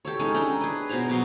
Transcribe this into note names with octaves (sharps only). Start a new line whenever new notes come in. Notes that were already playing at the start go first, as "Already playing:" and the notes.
G4 A4 C#5
G#3 C#4 D#4 A4
D4 G5 A#5 B5
G#4 B4
B2 C5 C#5 A#5
B2 F#3 A#3 C6